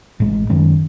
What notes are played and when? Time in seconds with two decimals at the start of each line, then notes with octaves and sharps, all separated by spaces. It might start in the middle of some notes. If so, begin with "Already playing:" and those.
0.20 A1 A2 G#3
0.50 F#2 D#3 G#3 C#4